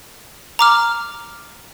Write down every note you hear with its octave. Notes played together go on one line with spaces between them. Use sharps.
A#5 D6 F6